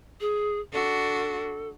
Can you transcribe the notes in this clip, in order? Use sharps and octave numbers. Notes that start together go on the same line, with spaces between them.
G#4
D4 F#4 A4